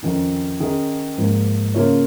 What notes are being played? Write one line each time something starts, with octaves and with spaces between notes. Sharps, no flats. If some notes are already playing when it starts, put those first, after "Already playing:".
F2 D#3 C#4
D#3 C#4 G#4 D#5
G#2 F3 A#3
C#3 A#3 F4 C#5